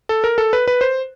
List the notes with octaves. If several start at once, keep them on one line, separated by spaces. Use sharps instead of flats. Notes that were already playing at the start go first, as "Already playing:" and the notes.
A4
A#4
A4
B4
B4
C5